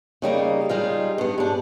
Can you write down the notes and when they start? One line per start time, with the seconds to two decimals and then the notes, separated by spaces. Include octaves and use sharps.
0.22 C#3 G3 A#3 D#4
0.69 G3 G#3 D#4 F4
1.18 G2 B3
1.38 G#2 D4